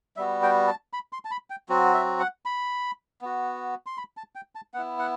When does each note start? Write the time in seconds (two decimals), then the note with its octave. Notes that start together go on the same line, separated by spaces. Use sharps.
0.16 G3 B3 F#4 E5
0.43 G5
0.67 A5
0.93 B5
1.13 C6
1.25 A5
1.31 B5
1.50 G5
1.69 F#3 C4 F#4
1.94 E5
2.20 F#5
2.45 B5
3.21 B3 F#4
3.86 C6
3.98 B5
4.17 A5
4.35 G5
4.55 A5
4.74 B3 E4 F#5
4.99 F#5